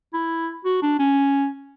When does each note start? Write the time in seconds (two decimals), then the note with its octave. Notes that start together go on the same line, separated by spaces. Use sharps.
0.14 E4
0.65 F#4
0.83 D4
0.99 C#4